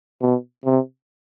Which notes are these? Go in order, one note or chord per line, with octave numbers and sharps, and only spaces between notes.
B2
C3